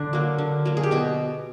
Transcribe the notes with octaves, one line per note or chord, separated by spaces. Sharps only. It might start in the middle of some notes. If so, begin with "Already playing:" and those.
Already playing: D3 D4
F#3 A#3
D3
F#3 A#3
G#4
G4
B2 F#4